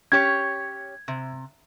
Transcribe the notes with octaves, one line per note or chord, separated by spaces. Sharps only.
C#4 G4 C#5 G#6
C3